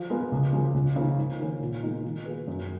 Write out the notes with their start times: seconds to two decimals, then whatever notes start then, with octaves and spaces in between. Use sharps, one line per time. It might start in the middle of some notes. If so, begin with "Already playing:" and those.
Already playing: F3
0.10 G#3 B3 F4 A#4
0.32 C#2
0.53 C#3 F3 G#3
0.74 C#2
0.96 C#3 F3 A#3 D#4
1.18 G#2
1.40 D#3 A#3 C#4
1.61 A#2
1.83 G#3 B3 D#4
2.04 D#3
2.25 A#3 F4 G#4 B4
2.47 F#2